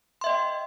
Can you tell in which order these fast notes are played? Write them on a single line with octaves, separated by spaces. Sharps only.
C6 E5 D#5 G5